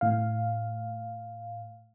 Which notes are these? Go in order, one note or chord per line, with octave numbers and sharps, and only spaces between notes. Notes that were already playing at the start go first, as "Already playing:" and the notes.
A2 F5